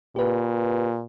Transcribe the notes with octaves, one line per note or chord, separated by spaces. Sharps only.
A#2 G4 B4